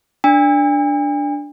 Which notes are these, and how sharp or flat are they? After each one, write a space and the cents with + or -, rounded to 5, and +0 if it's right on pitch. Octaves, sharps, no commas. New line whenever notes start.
D4 +0 G#5 -45